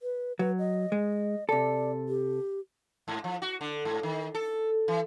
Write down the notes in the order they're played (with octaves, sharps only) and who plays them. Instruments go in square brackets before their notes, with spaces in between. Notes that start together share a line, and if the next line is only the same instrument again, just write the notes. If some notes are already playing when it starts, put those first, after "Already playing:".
[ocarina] B4
[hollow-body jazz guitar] F#3 [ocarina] B4
[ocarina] D#5
[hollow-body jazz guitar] G#3
[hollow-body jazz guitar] C3 A4 [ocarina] D5
[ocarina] G4
[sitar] G#2
F3
F#4
D3
G#2
D#3
A4
E3